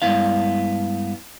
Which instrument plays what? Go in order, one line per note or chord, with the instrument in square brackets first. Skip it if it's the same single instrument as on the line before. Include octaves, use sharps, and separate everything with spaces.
[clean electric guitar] G2 G#3 B3 E4 F5